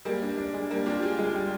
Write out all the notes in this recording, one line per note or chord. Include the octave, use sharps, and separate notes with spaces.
G3 G#3 A#3
D4
D4
G#3
G3 A#3 D4
D4 F4 G4
F4 G4 G#4
G#3
G3